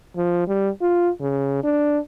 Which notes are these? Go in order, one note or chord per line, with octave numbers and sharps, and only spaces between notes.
F3
G3
F4
C#3
D4